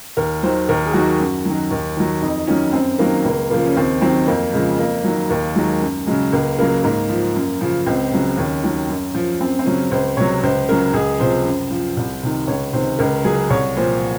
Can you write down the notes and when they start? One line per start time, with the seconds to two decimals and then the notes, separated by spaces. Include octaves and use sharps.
0.17 D#2 A#4
0.43 D#3 F#3 C5
0.69 D#2 A#4
0.86 G#4
0.93 D#3 F#3 F#4
1.19 F#2
1.45 D#3 F#3
1.71 D#2
1.97 D#3 F#3
2.22 F2 D#4
2.47 D#3 F#3 C#4
2.73 F#2 C4
2.99 D#3 F#3 A#3
3.25 C#2 A#3
3.50 C#3 F3 A#3
3.66 C#4
3.77 D#2 C4
4.02 D#3 F#3 C4
4.27 F2 A#3
4.53 C#3 F3 G#3
4.79 F2 A#3
5.04 D#3 F#3
5.29 D#2 A#3
5.55 D#3 F#3 G#3
5.81 F#2
6.06 C#3 F#3 G#3
6.33 C#2 A#3
6.58 C#3 F#3 A#3
6.84 G#2 A#3
7.09 F3
7.35 F#2
7.61 C#3 F3
7.86 C#2 C4
8.12 C#3 F#3
8.37 D#2 C#4
8.64 D#3 F#3
8.89 F#2
9.15 F3
9.40 F#2 C4
9.59 C4
9.66 C#3 F#3 C#4
9.91 C#2 C5
10.17 C3 F#3 C#5
10.43 C#2 C5
10.69 C#3 F#3 A#4
10.93 C#2 G#4
11.20 C3 F3 C5
11.45 F#2
11.71 F3
11.97 C2
12.23 C3 D#3
12.47 C#2 C#5
12.73 C3 D#3 C5
12.99 C#2 A#4
13.24 C#3 F#3 G#4
13.50 C2 C#5
13.76 A#2 F3 C5